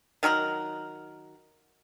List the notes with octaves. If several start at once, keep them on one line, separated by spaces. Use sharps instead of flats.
D#3 F#3 A#4 F#5